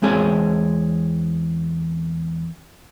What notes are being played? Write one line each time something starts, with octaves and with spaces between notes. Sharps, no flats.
E2 G#3 C4 G#4 C#5